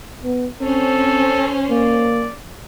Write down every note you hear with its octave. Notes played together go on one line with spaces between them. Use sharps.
B3
C4 C#4 A4 C5
A#3 D5